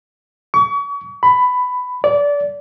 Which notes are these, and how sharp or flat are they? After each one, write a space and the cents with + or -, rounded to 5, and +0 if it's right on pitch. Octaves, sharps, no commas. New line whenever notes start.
C#6 +40
B5 +10
D5 -25